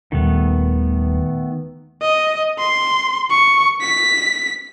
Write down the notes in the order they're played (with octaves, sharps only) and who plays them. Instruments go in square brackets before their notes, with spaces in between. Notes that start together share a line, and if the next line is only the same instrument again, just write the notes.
[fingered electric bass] D#1 G3 [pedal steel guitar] D#3 A3 B3
[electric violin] D#5
C6
C#6
B6